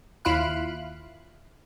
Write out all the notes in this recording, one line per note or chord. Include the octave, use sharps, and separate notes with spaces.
D#2 E4 F4 F5 B5 F#6